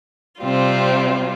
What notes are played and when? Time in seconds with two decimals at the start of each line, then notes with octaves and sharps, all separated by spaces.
0.41 C3 G3 C4 F4